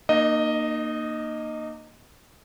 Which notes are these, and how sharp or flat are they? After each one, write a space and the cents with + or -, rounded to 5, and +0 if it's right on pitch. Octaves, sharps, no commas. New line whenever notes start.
A#3 +0 D#4 -35 D#5 +0